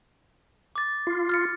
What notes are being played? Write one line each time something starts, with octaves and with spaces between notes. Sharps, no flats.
D6 A6
F4
F6 A6 C#7